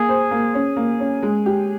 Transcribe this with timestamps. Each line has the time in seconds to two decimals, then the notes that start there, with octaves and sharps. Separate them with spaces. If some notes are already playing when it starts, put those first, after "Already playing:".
Already playing: A#3 G#4
0.09 C5
0.31 A#3
0.54 C#4
0.77 A#3
1.00 C#4
1.23 G#3
1.46 G4